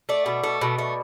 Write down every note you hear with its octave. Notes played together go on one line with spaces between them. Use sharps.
A3 D5
B2
A3
B2
A3